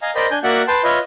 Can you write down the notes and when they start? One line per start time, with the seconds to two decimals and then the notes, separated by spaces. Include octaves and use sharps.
0.02 D#5 F5 G#5 A#5
0.15 A#4 C5 D5 D#5 G5 B5
0.31 D4 G#5 G6
0.44 A#3 F#4 D5 E5 F#5
0.68 B4 G5 A5 C6
0.84 F4 B4 C#5 D#5 E5 B5